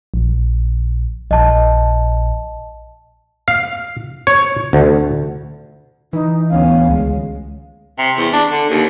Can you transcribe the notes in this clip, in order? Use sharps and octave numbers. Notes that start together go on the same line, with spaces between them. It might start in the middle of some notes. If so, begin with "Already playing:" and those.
A#1
A#1 D#5 A5
F5
C#5
D2
E3 D#4
D2 B3 C#4 F5
C#2 G#3
C3
E2
D4
D3
D#2